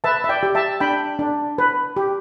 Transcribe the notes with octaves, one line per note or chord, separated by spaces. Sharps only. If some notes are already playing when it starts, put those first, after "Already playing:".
B4 E5 A5
E5
D5 G5
G4
E5 A5
D4 G5 B5
D4
B4
G4